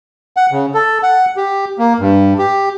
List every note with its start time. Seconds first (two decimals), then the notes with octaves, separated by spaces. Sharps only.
0.37 F#5
0.52 C#3
0.74 A4
1.03 F#5
1.37 G4
1.79 A#3
2.00 G2
2.38 G4